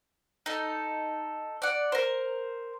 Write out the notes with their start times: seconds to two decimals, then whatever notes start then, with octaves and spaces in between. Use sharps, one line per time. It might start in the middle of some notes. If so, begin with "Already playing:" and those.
0.46 D#4 A4
1.62 D5 F#5
1.92 A#4 C5